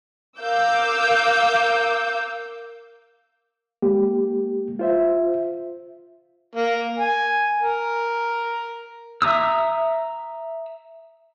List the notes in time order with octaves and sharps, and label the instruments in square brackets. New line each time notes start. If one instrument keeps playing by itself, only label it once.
[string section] A#4 F5 D6 E6 G6
[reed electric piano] G#3 A#3 G4
F4 C5 E5
[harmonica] A#3
G#5
A#4
[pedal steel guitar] E5 A#5 D#6 E6